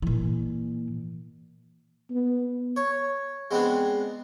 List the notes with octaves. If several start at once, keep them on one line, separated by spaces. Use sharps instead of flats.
A#2 E3
B3
C#5
G#3 B3 C4 D4